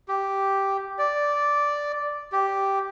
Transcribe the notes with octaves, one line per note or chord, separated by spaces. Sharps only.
G4
D5
G4